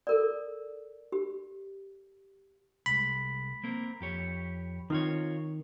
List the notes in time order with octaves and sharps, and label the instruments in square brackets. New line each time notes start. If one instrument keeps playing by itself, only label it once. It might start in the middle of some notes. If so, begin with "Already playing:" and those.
[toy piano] A4 A#4 D5
G4
[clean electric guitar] C2 G#3 [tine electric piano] B5
[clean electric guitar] A#3 C4 A#4
F2 G4 C#5
[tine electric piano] D#3 [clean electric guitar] C4 F4 C#5